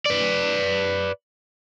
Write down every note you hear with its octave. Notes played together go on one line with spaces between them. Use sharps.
B4 D5